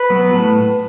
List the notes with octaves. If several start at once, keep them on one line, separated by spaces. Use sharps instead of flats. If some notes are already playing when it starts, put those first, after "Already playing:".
Already playing: B4
F#3 B3
A2